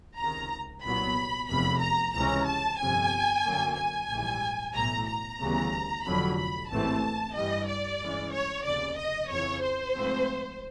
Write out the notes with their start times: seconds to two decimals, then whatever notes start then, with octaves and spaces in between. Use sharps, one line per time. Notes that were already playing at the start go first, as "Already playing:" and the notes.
0.18 C#2 C3 D#3 A#5
0.83 C2 A#2 F#3 B3 B5
1.49 F1 E2 C3 B5
1.81 A#5
2.14 C#2 C3 E3 G#3 C#4 A#5
2.47 A5
2.78 G1 F2 C3 G#5
3.44 F#2 D3 F#3 A#3
3.77 G#5
4.09 A#1 G#2 E3 G3
4.74 B1 A2 E3 A3 A#5
5.07 A#5
5.40 D2 C#3 E3 G3 B3
6.04 F1 F2 D3 F#3 B5
6.37 B5
6.70 A1 G#2 E3 A3 C4 A5
7.35 G2 E3 G3 D#5
7.67 D5
8.01 G2 E3 G#3 C#4
8.33 C#5
8.65 F1 D#2 C#3 D5
8.98 D#5
9.31 F2 C#3 E3 C#5
9.63 C5
9.96 G#2 F3 A3 C4